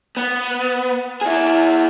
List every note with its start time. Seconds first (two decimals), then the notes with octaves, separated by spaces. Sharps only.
0.17 B3
1.21 E4 G#4